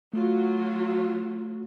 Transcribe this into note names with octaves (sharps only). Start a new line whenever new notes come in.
F#3 A3 F4 F#4